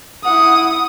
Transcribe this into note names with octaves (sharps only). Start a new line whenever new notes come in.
E4 F#5 D#6